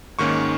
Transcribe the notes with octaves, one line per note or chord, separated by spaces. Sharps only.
G#2 D#3 A#3 C#4 C#6